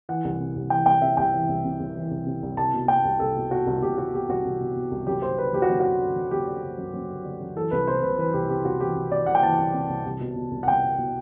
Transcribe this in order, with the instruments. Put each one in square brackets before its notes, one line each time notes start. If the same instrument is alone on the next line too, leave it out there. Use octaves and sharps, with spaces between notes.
[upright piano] E3 F#5
C2
C3
C2
E3 G5
C2 G5
C3 E5
C2 G5
E3
C2
C3
C2
E3
C2
C3
C2
C2 A5
B2
B2 G5
C2
C2 A4
B2
B2 F#4
C2
C2 G4
B2 F#4
B2 G4
C2 F#4
C2
B2
B2
C2
F#2 G4
D3 C5
D3 B4
F#2 G4
F#4
F#2
D3 F#4
D3
F#2
F#2 G4
D3
D3
F#2
F#2
D3
D3
F#2
E3 A4
C2 B4
C3 C5
C2 B4
E3 B4
C2 G4
C3 G4
C2 F#4
E3 G4
C2
C3 D5
C2 F#5
G5
E3 A5
C2
C3
C2
C2
B2
B2
C2
F#5
C2 G5
B2
B2